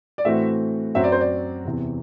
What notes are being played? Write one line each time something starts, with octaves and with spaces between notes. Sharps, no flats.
D5
A2 E3 A3 C4 F#4 E5
F#2 F#3 C4 F#4 E5
D5
C5
D5
E2 C3 E3